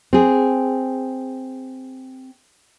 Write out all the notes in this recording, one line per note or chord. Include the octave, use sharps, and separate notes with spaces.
C4 G#4